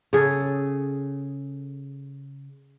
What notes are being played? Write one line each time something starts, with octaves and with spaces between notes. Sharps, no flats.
C#3 G#4 A4